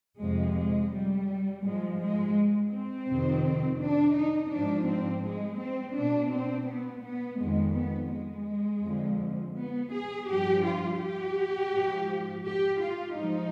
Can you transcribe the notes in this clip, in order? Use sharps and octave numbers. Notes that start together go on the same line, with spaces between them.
F2 C3 F3 G#3
G#3
G3
G#2 F3 G#3
G#3
C4
F2 C3 D#3
D4
D#4
G#2 F3 D4
C4
G#3
C4
B2 D4
C4
B3
B3
F2 D#3 G#3
B3
G#3
F2 D3 F3
B3
G#4
G2 F3 G4
F4
G4
G#2 F3
G4
F4
G#2 F3 D#4